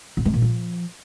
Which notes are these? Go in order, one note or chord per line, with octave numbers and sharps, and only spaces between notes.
B2
C3
A#2
F3